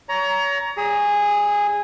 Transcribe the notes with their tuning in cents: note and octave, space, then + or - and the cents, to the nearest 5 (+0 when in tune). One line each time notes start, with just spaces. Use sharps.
C#5 +30 A#5 +10
G3 -10 G#4 -15 D#6 +35